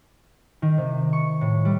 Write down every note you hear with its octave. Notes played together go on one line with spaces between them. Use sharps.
D#3
C3
C#6
A2
G3